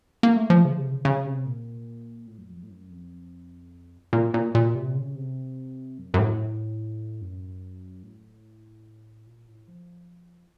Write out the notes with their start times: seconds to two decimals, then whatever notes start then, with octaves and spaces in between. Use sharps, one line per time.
0.23 A#3
0.36 A3
0.50 F3
0.65 C#3
0.78 C3
0.91 C#3
1.05 C#3
1.26 C3
1.46 A#2
2.27 A2
2.38 F#2
2.49 F2
2.63 A2
2.70 F#2
2.90 F2
4.13 A#2
4.34 A#2
4.55 A#2
4.75 C3
4.95 C#3
5.15 C3
5.98 F#2
6.14 F#2
6.19 A2
7.21 F#2
8.03 A2
9.27 A#2
9.48 A2
9.68 F3